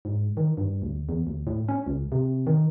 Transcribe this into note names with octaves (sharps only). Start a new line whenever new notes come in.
G#2
D#3
G2
D2
E2
D2
A2
C#4
C#2
C3
D#3